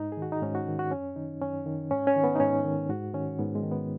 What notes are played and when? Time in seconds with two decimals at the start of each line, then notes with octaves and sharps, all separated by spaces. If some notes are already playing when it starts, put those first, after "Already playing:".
Already playing: G#2 D#4
0.12 G#4
0.17 D#3
0.22 F#4
0.32 D#4
0.42 G#2 C#4
0.55 F#4
0.68 D#3
0.79 F#4
0.91 F#2 C#4
1.16 D#3 D#4
1.41 F#2 C#4
1.66 D#3
1.91 G#2 C#4
2.07 C#4
2.16 D#3
2.24 B3
2.35 D#4
2.40 G#2 C#4
2.65 D#3
2.89 G#2 F#4
3.14 D#3 C#4
3.39 G#2 B3
3.55 G#3
3.63 D#3
3.72 B3